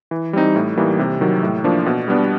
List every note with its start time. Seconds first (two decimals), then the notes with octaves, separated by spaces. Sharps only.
0.11 E3
0.33 G3 C4 D#4
0.56 A2
0.77 E3 G3 A#3 D#4
0.99 C3
1.21 D#3 F#3
1.43 A2
1.64 F3 A#3 D4
1.86 B2
2.08 G3 B3 D4